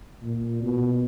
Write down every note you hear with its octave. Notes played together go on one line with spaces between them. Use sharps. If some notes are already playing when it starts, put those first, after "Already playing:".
A#2
B2